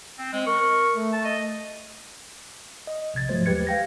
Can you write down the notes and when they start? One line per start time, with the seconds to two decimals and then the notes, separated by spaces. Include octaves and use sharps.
0.18 C4
0.33 G#3 C4
0.46 A#4 C#6
0.94 A3
1.13 A5
1.25 D#5
2.87 D#5
3.14 A#1 C3 G#6 A6
3.29 G#2 F3 F#3 A3 C5
3.46 D#2 G#3 G4 B4 G#6 C#7
3.67 F5 G5 A#6